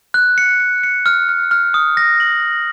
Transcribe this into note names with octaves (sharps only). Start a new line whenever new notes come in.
F#6
C#7
C#7
C#7
F6
F6
F6
D#6
A#6
F#7